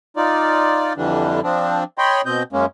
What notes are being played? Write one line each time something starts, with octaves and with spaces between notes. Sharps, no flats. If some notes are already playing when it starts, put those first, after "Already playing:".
D#4 F4 D5
F2 D3 E3 G3 D4
F3 C4 D4
C#5 D#5 G5 B5 C6
B2 C4 D#5 G6
F#2 G#3 A#3 C#4